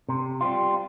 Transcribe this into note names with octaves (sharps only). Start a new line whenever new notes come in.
C3
G3 C4 F4